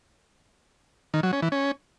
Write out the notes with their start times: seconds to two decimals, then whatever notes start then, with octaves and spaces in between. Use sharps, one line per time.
1.14 D#3
1.23 F#3
1.33 C#4
1.42 E3
1.52 C#4